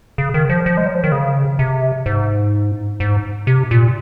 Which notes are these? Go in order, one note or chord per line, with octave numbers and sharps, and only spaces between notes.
C#3
D#3
F3
F3
G#3
F#3
F3
D#3
C#3
C3
G#2
G#2
C3
A#2